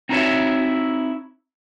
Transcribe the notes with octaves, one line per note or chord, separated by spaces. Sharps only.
C4 D#4 E4 F#4 C#5 E5